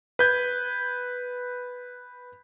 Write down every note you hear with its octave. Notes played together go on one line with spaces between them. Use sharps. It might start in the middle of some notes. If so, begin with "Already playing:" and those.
B4 G6 G#6